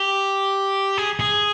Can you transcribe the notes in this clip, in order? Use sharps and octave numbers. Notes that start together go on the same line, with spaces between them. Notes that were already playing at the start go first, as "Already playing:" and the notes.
Already playing: G4
G#4
G#4